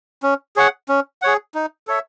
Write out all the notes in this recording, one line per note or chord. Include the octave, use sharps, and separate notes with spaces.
C#4
G#4 C#5 F#5
C#4
G#4 C#5 F#5
D#4
A4 C#5 E5